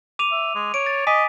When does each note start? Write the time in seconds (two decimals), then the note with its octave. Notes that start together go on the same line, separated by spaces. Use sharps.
0.19 D6 D#7 F7
0.32 E5
0.55 G#3
0.74 C#5 D7
0.86 A6
1.07 D#5 G#5 D6 B6